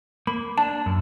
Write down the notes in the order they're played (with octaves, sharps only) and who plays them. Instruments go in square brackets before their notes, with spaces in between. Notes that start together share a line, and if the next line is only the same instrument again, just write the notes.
[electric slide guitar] A#3 [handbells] B5
[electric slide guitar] D4 [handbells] A5
[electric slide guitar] F#2